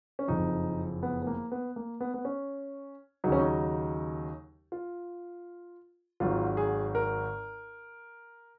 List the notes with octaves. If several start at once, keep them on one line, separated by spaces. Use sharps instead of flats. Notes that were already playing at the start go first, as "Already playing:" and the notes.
C#4
F#1 F2 F3 D#4
B3
B3
A#3
B3
A#3
B3
B3
C#4
D#2 C#3 F#3 D#4
C#4
D#4
F4
G#1 G#2 D#3 F#3 F4
G#4
A#4